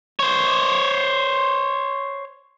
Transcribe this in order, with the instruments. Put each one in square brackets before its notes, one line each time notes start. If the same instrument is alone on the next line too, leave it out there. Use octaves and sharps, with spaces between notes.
[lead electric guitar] C5 C#5